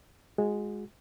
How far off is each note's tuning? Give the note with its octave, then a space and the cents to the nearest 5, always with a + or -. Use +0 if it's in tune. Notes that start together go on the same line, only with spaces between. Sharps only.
G#3 +0 F#4 -30